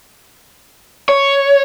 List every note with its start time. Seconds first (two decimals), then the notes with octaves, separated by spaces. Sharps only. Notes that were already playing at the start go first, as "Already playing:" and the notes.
1.09 C#5